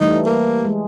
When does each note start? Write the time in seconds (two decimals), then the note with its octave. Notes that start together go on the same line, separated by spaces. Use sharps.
0.01 E3 G3 A3 D#4
0.26 A#3
0.65 G#3